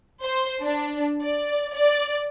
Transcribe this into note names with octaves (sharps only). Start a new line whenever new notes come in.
C5
D4
D5
D5